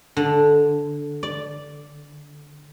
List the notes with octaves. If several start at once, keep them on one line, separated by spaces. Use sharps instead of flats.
D3
D5